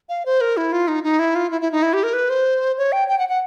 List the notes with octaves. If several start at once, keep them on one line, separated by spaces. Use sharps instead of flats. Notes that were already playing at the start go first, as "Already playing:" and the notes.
F5
C5
A#4
E4
F4
D#4
D#4
E4
F4
E4
E4
D#4
E4
G4
A#4
B4
C5
C#5
G5
G5
F#5
F#5